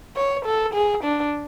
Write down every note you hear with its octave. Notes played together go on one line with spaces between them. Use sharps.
C#5
A4
G#4
D4